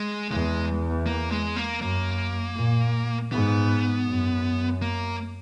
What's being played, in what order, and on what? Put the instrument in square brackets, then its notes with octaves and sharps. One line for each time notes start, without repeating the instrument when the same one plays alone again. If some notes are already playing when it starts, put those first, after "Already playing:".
Already playing: [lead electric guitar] G#3
[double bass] E2 [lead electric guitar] G#3
[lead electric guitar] A#3
G#3
A#3
[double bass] F#2 [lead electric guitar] A#3
[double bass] A#2
[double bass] G#2 [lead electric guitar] B3
[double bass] F#2
[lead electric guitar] A#3